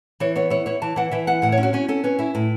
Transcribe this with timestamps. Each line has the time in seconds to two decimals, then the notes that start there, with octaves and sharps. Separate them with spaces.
0.20 E3 C#5
0.36 B3 C#5
0.50 E4 C#5
0.66 E4 C#5
0.82 E3 A5
0.96 E3 F#5
1.11 E3 E5
1.27 E4 F#5
1.42 A2 F#5
1.52 C#5
1.58 C#4
1.63 F#4
1.73 C#4 F#4
1.88 C#4 A4
2.04 C#4 B4
2.19 E4 E5
2.35 A2